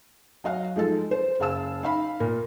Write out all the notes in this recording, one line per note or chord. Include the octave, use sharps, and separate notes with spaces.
F#3 D#5 F5 F#5
F3 G#3 D#4 A4
C5
F#1 G#4 F5 A5 E6 E7
D#4 F5 B5
A#2 A#4